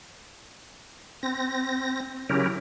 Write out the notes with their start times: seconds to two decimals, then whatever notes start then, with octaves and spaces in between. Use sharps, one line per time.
1.23 C4 A#6
2.29 C#3 F#3 C#4 E4 G4 A#4